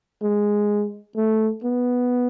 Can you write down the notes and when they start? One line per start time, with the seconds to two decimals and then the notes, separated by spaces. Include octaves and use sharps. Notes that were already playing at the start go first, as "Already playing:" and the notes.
0.23 G#3
1.16 A3
1.64 B3